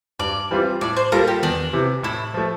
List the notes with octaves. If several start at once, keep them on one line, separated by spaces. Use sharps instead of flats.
G2 D5
E3 G3 C4 F4
A2 D5
C5
G3 A#3 F4 A4 A#4
G4
E2 D4
C3 E3
A2 E4
F3 A3